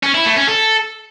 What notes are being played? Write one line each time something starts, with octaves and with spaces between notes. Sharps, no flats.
C#4
E4
A3
C#4
A4